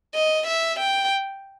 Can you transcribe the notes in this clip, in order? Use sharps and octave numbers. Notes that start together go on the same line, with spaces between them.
D#5
E5
G5